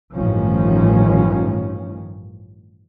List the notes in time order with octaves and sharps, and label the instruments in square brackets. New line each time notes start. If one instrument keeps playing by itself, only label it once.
[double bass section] A1 G2 D#3 F3 C#4